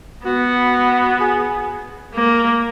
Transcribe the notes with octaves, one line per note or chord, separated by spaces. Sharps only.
B3 F#4
G#4
A#3